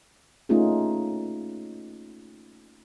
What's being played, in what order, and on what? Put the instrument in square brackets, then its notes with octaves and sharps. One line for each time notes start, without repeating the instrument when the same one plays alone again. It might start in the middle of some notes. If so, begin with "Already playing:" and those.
[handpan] A3 A#3 C#4 D#4 F4 G#4